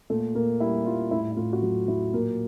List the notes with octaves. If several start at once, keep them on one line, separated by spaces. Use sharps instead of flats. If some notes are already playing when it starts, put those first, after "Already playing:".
A#2 A3
A#2 A#3
G3 E4
G3 F4
A2 E4
E4
A2 F4
F#4
F#3 F4
F#3 E4
A#2 A#3